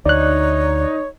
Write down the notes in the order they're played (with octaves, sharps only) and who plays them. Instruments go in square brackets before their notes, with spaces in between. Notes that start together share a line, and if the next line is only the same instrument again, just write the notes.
[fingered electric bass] D2 [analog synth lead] D#4 [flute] C#5 [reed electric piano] D5 F#6